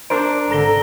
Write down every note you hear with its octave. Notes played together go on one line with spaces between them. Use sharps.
D4 A#4 C5 D7
G#1 D3 A4 A#5 A#6 G7